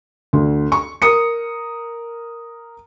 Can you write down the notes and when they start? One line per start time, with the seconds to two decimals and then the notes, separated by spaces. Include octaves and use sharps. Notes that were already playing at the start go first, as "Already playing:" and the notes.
0.33 D2
0.72 C#6
1.02 A#4 D#6 C#7